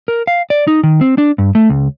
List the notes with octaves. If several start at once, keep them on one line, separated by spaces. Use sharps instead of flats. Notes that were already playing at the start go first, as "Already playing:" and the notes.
A#4
F5
D5
D#4
D#3
C4
D4
G2
A3
C#2